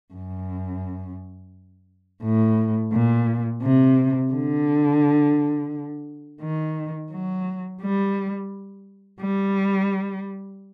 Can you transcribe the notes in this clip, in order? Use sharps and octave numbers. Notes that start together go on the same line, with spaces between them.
F#2
A2
A#2
C3
D3
D#3
F#3
G3
G3